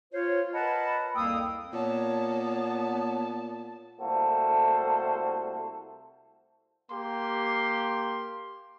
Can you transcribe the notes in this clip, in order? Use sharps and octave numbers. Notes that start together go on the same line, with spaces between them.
F4 C5 C#5
A#4 B4 D#5 F#5 A5 B5
C2 F2 A#3 G5 D#6 E6
A#2 B3 C#5 A5
C2 A3 A#3 F#4 A4 C5
A#3 G4 C6